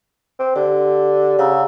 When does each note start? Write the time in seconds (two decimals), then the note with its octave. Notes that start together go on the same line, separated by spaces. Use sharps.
0.39 C4
0.56 D3 G4
1.39 C#3 F#5 A#5 E6